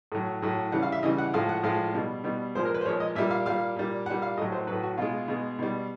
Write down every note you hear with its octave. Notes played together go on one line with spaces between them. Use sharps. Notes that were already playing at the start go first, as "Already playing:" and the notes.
A2 F#3
A2 F#3
C#3 E3 G3 F#5
F5
E5
C#3 E3 G3 D#5
F#5
A2 F3 G#3 F5
F#5
A2 F3 G#3 F5
B2 G3
B2 G3
A#2 F3 G#3 C5
A#4
B4
C5
A#2 F3 G#3 C#5
D#5
A#2 G3 E5
F5
A#2 G3 F5
A#2 G3
A#2 G3 F#5
F5
A2 F#3 D#5
C5
A2 F#3 B4
F#4
B2 G#3 F4
B2 G#3
B2 G3